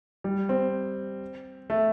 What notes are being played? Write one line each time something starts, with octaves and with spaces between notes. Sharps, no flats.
G3
C4
A3